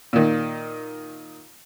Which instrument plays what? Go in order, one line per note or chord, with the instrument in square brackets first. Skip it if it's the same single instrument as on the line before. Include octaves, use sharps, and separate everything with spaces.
[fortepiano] A#2 D#3